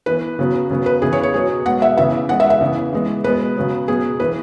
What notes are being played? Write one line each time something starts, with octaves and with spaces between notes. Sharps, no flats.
E3 B3 B4
C#3 F#3 B3
C#3 F#3 B3
B4
C#3 E3 B3 G#4
C#5
C#5
B2 F#3 B3 G#4
B2 G#3 B3 F#5
E5
C#3 E3 B3 E5
E3 G#3 B3 F#5
E5
E5
C#3 E3 B3
E3 G#3 B3
B2 G#3 B3 B4
C#3 F#3 B3
B2 F#3 B3 G#4
E3 B3 B4